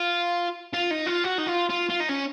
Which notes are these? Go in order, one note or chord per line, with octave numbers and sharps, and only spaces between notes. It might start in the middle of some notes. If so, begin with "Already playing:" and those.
Already playing: F4
F4
D#4
F4
F#4
D#4
F4
F4
F4
D#4
C#4